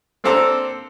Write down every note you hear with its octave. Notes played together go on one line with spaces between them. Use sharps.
A#3 C4 D4 A4 C5 A#5